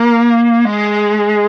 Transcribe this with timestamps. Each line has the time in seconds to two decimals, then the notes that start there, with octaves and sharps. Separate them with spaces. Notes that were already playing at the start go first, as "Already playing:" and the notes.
Already playing: A#3
0.65 G#3